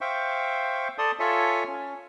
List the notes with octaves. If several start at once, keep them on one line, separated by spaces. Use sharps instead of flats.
C5 E5 F5 G5 C#6
A4 D5 A5 C6 D#6
F4 A4 C#5 E5 G#5
C#4